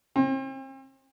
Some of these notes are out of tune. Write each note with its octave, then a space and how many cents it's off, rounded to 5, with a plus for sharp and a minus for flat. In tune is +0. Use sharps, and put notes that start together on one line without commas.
C4 +40